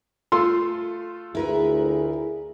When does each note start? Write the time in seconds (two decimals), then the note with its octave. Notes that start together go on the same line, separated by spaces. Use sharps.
0.32 A3 F4 A4 C6
1.35 D2 E4 G#4 A#4 B4